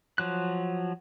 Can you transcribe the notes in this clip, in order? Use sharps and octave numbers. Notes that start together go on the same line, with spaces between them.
F3 F#3 F#6